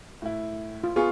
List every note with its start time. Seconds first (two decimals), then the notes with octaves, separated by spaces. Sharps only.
0.22 A2 E4
0.84 F4
0.96 B3 F4 G#4 C#6